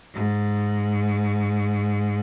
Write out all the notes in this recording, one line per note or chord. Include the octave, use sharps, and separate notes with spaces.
G#2